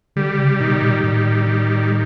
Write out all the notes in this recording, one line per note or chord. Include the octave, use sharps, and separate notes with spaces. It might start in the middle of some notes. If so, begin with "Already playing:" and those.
D3 G3
C#3
B2 D#3
A#2
A2 G3
D#3